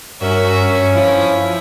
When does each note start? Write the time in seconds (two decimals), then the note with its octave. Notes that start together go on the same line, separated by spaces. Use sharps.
0.21 G2 F#3 C#4 F#4 A#4 E5
0.93 F3 E4 C#5